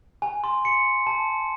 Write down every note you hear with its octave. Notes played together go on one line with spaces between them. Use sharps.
G#5
C6
C#7
A5